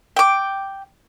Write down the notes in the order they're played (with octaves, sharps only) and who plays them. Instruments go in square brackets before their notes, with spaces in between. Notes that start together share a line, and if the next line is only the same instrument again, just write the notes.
[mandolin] G5 D6